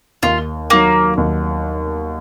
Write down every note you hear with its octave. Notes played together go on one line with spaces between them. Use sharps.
D#2 F4
D#3 F#3 A#3
D#2